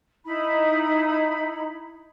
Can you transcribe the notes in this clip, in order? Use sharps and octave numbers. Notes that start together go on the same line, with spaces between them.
D#4 E4 B5